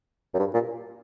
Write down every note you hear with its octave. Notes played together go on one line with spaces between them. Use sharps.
F#2
G2
A#2